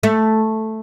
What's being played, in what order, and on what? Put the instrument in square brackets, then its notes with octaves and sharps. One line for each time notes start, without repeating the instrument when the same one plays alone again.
[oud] A3